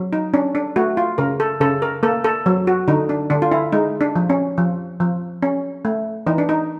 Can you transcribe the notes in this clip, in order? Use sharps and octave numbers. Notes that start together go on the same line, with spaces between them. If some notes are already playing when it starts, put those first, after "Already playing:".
Already playing: F#3
D#4
C#4 D4
D4
A3 F#4
F4
C#3 A#4
A4
C#3 A4
A#4
A#3 A4
A4
F#3
F#4
D3 D#4
D4
D3 D4
F4
E4
G#3 D#4
D4
F3
C#4
F3
F3
C#4
A3
E3 D#4
D4
D#4